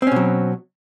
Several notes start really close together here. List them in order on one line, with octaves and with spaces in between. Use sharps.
C4 C#4 B2 F#3